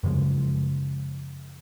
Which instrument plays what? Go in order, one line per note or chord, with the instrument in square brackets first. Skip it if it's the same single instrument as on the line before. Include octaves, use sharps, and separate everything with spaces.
[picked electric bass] F#2 C#3 F3 G#3